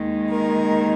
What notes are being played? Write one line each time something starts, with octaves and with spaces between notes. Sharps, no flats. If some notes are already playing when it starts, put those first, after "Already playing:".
Already playing: D#2 D#3 G#3
A#4